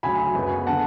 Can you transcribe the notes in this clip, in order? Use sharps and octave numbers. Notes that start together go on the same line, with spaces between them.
D2 C#3 F#3 G#5 B5
F#2 C#3 G#3 B3
D3 F#5 A5